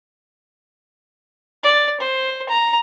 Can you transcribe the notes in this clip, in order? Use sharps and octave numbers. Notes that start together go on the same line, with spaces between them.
D5
C5
A#5